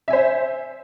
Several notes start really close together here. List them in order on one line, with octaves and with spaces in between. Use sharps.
E5 G#5 C5